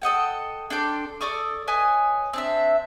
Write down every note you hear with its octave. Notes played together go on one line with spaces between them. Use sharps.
A4 D#5 F#5 G5
D4 A4 G5 C6
A4 D5 C#6 D#6
B4 C#5 D#5 G#5
C4 D4 E5